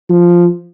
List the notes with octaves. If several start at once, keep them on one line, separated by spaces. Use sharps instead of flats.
F3